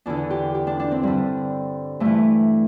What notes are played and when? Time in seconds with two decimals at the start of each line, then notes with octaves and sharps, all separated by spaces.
0.06 E2 D3 D4
0.30 G4
0.55 G4
0.67 D4
0.80 D4
0.91 C4
1.03 G2 D3 G3
2.00 G2 E3 A3